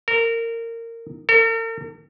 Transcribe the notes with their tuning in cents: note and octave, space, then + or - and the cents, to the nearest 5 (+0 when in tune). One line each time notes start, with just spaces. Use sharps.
A#4 -20
A#4 -45